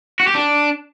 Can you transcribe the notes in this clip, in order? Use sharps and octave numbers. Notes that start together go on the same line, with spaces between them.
F#4
G4
D4